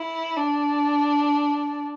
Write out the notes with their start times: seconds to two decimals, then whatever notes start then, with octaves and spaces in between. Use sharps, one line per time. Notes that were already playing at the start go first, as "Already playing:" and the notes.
Already playing: E4
0.36 D4